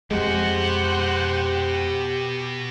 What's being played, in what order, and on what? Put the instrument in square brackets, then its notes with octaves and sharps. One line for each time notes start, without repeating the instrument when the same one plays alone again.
[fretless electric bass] F2 G#3 [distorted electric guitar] B2 F#4 [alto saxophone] G4 [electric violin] C5 F#5